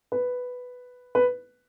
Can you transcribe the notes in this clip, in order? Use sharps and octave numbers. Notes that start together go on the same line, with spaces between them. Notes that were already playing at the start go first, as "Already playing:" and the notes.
B4
B4